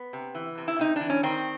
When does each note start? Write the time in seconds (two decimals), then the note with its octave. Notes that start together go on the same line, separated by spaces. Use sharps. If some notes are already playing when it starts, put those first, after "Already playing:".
Already playing: B3
0.13 C3
0.35 E3
0.58 C3
0.68 E4
0.79 C3 D#4
0.96 E3 D4
1.10 C#4
1.23 D#3 C4